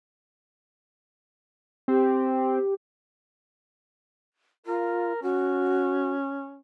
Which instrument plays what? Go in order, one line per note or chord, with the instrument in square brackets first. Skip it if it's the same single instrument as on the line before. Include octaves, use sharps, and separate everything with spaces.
[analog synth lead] C4 [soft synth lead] G4
[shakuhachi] F4 [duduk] A#4
[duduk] C#4 [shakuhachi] F#4